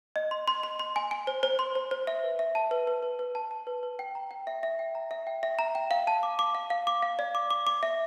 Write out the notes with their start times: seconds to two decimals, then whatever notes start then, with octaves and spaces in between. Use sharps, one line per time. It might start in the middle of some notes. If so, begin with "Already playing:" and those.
0.16 D#5
0.31 C6
0.48 C6
0.63 C6
0.79 C6
0.96 G#5
1.11 G#5
1.27 C5
1.43 C5
1.59 C6
1.75 C5
1.91 C5
2.07 E5
2.24 B4
2.39 E5
2.55 A5
2.71 B4
2.87 B4
3.03 B4
3.19 B4
3.35 A5
3.51 A5
3.67 B4
3.83 B4
3.99 G5
4.15 A#5
4.31 G5
4.47 E5
4.63 E5
4.79 G5
4.95 A#5
5.11 E5
5.27 G5
5.43 E5
5.59 A#5
5.75 G5
5.91 F5
6.07 A5
6.23 D6
6.39 D6
6.55 F5
6.70 F5
6.87 D6
7.03 F5
7.19 D5
7.35 D6
7.50 D6
7.67 D6
7.83 E5